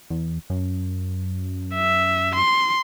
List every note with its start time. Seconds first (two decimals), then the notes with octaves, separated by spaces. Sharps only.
0.10 E2
0.50 F#2
1.75 E5
2.35 C6